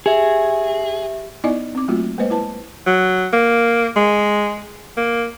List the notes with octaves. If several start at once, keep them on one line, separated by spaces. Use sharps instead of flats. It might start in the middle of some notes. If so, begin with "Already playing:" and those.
G4 G#4 E5
B3 D#4 E4 D5 D#5 G#5
C4 D6
F#3 A3 A#3 F4 F#4
G#3 A#3 B4 C5 D#5
E4 B4 A5
F#3
A#3
G#3
A#3